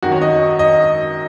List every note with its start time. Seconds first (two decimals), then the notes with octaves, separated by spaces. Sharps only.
0.03 F#2 D#3 F#4
0.12 C#5
0.22 D#5
0.59 D#5